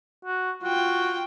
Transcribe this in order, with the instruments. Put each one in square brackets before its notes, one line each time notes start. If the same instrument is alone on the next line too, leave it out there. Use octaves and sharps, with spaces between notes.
[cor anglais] F#4
[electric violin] F4 G5 [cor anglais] F#4